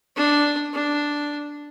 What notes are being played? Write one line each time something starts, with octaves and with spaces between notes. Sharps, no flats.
D4
D4